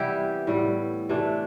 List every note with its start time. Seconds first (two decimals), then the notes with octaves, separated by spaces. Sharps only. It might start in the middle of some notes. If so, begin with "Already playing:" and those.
Already playing: C3 E3 G3 B3 E4 G4
0.47 A2 G3 B3
1.09 C3 E3 A3 D4